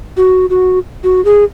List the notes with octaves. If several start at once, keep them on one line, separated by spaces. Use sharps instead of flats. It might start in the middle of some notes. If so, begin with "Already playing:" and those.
F#4
F#4
F#4
G#4